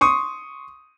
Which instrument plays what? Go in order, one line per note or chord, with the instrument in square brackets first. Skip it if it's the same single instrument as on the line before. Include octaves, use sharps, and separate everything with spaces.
[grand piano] C6 C#6 D#6